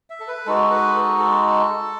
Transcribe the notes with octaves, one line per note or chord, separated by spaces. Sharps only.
E5
A4
B4
G#3 D#4 F#4 A4
B4
A4
A4